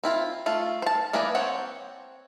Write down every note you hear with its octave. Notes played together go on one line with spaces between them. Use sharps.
C4 E4 F4
A3 F4
C5 A5
E3 A#3 G#4 B4 D5
C4 C5 C#5 F#5